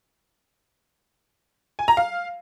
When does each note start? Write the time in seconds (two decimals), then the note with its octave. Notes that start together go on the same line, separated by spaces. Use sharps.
1.79 G#5
1.88 A#5
1.97 F5